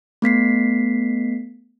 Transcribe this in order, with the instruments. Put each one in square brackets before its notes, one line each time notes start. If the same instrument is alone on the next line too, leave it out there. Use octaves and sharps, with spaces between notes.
[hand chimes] A3 B3 B6 C7